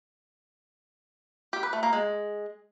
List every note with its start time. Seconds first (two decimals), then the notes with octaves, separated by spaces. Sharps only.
1.53 G4
1.63 B4
1.73 A3
1.83 A#3
1.93 G#3